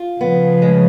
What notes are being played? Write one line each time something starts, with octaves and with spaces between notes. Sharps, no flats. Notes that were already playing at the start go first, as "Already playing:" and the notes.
Already playing: F4
C#3 F3 B3
G#3